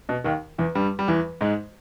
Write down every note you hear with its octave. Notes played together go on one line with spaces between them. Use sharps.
B2
D#2 D#3
E2 E3
G2 G3
G3
E2 E3
G#2 G#3